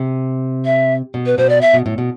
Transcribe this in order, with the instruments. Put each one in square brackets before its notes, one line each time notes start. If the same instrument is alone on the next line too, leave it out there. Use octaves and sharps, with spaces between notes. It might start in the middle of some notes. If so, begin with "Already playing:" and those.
Already playing: [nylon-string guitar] C3
[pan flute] E5
[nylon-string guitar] B2
[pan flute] B4
[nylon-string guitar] B2 [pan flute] C5
[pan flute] D5
E5
[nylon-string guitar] B2
A2
B2